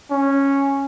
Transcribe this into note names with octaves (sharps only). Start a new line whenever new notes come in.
C#4